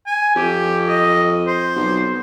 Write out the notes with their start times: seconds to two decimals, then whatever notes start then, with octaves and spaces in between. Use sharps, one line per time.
0.06 G#5
0.36 F2 G4
0.88 D#5
1.47 C5
1.76 B1